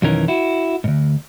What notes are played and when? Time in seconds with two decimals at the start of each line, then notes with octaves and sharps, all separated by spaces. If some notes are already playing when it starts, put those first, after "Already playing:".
0.02 B1 F2 D#3 E3 C#4 A#4
0.28 E4 F#4
0.84 D2 G#2